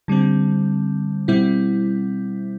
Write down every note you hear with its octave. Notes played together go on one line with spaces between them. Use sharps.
D3 G3 C4
B2 G3 C4 E4